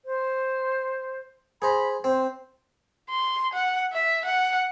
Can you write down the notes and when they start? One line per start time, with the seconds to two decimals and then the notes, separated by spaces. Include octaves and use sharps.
0.05 C5
1.62 G#4 C5 A#5 B5
2.04 C4 C5
3.10 C6
3.53 F#5
3.93 E5
4.25 F#5